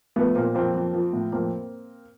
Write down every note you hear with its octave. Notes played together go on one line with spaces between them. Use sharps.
F3 A3 B3
A#2 A#3 C4
F2 A#3 C4
F2
F3
A2
F2 A#3 C4